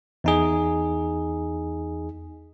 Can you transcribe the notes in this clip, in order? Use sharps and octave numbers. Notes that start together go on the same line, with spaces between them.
E2 D#4 G#4